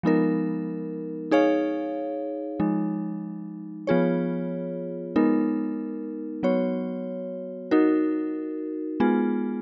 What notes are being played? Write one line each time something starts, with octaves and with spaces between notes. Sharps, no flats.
F3 G#3 B3 D#4 A#4
D#4 G#4 C#5 F5
F3 G#3 D#4
F3 B3 F4 G#4 C#5
G#3 B3 D#4 A#4
F#3 B3 F#4 C#5
D#4 F#4 A#4
G#3 B3 F4 G#4